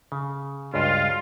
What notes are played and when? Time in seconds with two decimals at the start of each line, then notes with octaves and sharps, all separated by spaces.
0.12 C#3
0.74 C#2 G2 F4 F#4